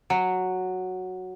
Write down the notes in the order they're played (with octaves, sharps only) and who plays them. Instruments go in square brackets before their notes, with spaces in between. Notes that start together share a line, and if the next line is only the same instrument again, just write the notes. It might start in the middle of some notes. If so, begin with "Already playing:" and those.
[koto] F#3